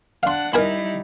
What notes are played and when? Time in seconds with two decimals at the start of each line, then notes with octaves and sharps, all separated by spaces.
0.23 D4 F5 F#5 C6
0.53 G3 D#4 E4 A#4 G#5 B5